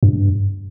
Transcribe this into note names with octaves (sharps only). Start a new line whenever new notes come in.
G2